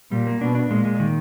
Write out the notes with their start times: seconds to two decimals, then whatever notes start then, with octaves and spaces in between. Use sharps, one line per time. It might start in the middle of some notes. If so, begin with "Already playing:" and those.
0.12 A#2 G3
0.27 A#3
0.41 B2 D4
0.55 D4
0.70 A#2 G#3
0.85 G#3
1.00 D#3